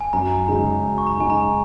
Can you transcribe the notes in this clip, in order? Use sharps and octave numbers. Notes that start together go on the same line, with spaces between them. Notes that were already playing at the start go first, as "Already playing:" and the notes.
G#5
F#2 A#5
C#3 G#3 D#4 A#5
F#2 G#5
C#6
A#5
C#3 G#3 D#4 G#5
A#5